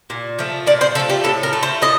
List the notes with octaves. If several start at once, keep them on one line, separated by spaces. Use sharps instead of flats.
A#2
F3 A3
A#2 D5
C5
F3 A3 A4
G4
A2 A4
A#4
A3
C5
A2 D#5